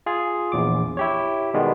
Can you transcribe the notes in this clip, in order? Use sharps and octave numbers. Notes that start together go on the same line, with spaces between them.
F4 G#4
A#1 E2 D6
E4 G4 C#5
B2 D#3 G3 G#3 B3